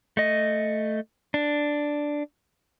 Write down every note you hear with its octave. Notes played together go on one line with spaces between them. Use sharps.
A3 D#5
D4